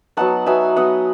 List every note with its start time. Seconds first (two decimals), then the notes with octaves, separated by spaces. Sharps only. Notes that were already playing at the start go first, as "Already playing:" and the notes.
0.17 F#3 B3 D#4 F#5 A5
0.46 F#3 B3 D#4 E5 G#5
0.76 F#3 B3 D#4 D#5 F#5